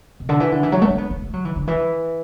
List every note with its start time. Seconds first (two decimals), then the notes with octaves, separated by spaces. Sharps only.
0.20 B2
0.29 D3
0.40 E3
0.52 D3
0.63 E3
0.72 F#3
0.82 A3
0.89 D4
0.98 B3
1.10 B3
1.22 A3
1.33 F#3
1.45 E3
1.56 D3
1.67 E3